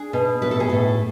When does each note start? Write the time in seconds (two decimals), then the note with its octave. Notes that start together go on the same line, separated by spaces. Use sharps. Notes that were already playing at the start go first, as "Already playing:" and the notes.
Already playing: D4 G#4
0.13 B2
0.42 A2 B4
0.51 A4
0.60 G#4
0.69 A2 A4